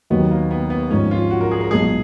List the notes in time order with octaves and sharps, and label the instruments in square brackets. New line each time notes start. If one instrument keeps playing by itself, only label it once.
[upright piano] D#2 D#3 F#3 [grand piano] B3
[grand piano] A#3
B3
B3
[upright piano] G#1 G#2 F3 G#3 D#4 [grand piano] C#4
[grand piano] F4
F#4
A#4
G#4
A#4
[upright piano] B1 A#2 G#3 [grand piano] G#4